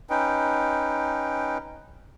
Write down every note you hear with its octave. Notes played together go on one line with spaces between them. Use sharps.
C#4 D#4 B4 G5